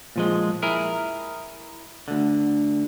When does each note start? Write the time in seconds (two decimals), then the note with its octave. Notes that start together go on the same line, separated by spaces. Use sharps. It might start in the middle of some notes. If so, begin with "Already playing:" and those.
0.16 A#2 F3 G#3
0.63 E4 G#4 A#4
2.08 D2 D3